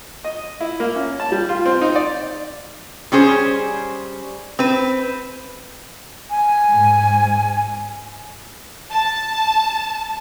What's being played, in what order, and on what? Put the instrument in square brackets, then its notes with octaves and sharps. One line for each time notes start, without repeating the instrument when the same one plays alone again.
[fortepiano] D#5
E4
A#3
C#4
A5
G3
F4
C4
D#4
D5
[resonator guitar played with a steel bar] G3 C#4 G#4 C5
C4 B4
[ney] G#5
[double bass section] G#2
[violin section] A5